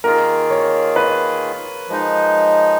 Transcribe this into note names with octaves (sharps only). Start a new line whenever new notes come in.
D#3 A#3 F4 G#4 A#4
C#5
B4
F3 G#3 D#4